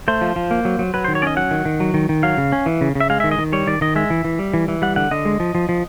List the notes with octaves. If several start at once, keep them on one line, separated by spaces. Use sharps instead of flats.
A3 C5
F3
F3
A#3
F#3
F#3
F#3 B4
D#3 C5
C#5
C#4 D5 D#5
F#3 F#5
D#3
D#3
F#3
D#3
D#3
F#3 F5
C#3
C#4
E3
C#3
C#3
E5
G#3 F5
D#3 E5
D#5
D#3
G3 C#5
D#3 D5
D#3 D#5
G#3 E5
E3
E3
G3
E3
E3
G3 F#5
D3 F#5
D3 D#5
G#3
F3
F3
F3